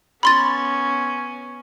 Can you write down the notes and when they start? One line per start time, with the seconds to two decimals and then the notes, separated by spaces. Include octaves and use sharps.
0.23 B3 C#4 B5 C6 A6